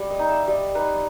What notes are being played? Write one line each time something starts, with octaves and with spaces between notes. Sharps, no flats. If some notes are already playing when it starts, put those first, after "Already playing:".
Already playing: G3
D#5
D#4
E5
G3 D#5
D#4 B4